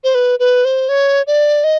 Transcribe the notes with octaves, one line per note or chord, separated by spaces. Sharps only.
C5
B4
B4
C5
C#5
D5
D#5